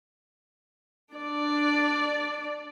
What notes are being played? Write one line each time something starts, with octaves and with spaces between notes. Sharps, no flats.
D4 D5